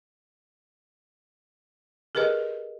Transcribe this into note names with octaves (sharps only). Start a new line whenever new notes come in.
G4 G#4 A#4 B4 D#5